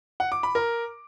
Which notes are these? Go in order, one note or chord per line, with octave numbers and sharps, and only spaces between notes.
F#5
D6
B5
A#4